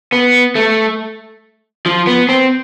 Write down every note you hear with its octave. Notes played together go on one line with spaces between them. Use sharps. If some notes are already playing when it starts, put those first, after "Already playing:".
B3
A3
F3
B3
C4